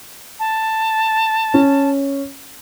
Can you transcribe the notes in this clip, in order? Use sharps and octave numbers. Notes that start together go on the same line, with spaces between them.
A5
C#4